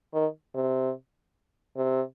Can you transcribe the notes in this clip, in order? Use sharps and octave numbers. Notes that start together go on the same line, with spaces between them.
D#3
C3
C3